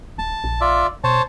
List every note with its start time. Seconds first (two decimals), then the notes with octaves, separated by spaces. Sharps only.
0.18 D1 A5
0.44 A#1
0.61 F4 D5 E5
1.04 B2 C5 C#5 A5